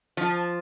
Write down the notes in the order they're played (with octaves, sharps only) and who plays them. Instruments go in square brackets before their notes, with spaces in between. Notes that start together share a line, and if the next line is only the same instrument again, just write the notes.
[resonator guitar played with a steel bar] F3